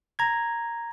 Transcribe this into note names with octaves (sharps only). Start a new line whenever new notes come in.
A#5 G#6